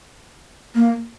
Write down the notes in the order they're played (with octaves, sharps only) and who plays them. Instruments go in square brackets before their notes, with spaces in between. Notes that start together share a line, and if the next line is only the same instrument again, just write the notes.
[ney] A#3